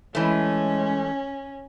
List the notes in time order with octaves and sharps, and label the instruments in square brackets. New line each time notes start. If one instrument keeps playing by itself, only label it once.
[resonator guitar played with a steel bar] E3 A3 [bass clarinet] G#3 [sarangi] C#4